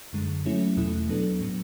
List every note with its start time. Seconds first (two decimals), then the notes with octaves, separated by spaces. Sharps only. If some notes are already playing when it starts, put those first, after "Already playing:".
0.13 F#2 D3 G#3
0.45 F#3 A3 C#4 E4
0.77 E2 B2 A3 E4
1.08 F#3 B3 D4 A4
1.41 A2 F#3 B3